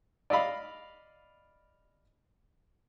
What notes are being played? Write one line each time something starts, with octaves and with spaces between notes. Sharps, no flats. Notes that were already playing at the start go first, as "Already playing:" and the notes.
D5 D#5 F5 B5